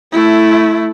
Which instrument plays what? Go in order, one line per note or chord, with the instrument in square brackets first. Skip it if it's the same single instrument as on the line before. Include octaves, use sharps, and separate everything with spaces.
[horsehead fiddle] A3 E4